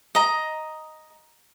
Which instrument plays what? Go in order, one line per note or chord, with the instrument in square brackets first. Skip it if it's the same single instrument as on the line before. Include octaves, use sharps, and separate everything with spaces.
[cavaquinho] D#5 A#5